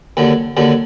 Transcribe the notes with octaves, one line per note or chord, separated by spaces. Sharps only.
D#2 D3 F#3
D#2 D3 F#3